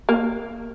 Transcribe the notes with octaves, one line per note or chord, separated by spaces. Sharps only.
A#3